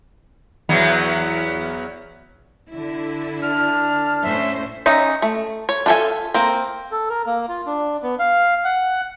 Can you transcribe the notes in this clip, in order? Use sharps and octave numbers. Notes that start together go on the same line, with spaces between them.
E2 F#3 B3
D3 E4
D4 F6
A2 C#4 C5 E5
C#4 D#4 E5
A3
C#5
D4 F4 A4 E5 G#5
A#3 C4
A4
A#4
A#3
F4
D4
B3
F5
F#5